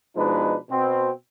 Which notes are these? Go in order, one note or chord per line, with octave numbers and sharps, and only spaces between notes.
B2 F3 G#3 D4 D#4 B4
B2 C4